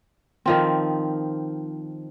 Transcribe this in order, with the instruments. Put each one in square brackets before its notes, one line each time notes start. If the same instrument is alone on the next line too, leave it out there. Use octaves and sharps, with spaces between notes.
[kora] D#3 F3 C4